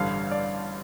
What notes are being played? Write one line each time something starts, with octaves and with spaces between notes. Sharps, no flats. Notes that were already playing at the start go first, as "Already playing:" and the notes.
Already playing: A1 G2 D3 F5
D5